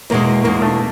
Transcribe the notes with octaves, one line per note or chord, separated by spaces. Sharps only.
E2 B2 G#3 A#3
E2 B2 G#3 A#3
A3